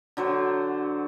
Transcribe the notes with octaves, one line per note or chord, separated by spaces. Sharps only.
D3 F#3 C5